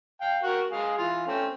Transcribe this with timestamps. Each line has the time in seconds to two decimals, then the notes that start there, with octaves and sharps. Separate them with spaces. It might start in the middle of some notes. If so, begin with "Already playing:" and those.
0.21 F5 G5
0.43 F#4 A#4
0.72 G#3 G#4 F5
0.98 E3 F4
1.27 A3 C4 C#4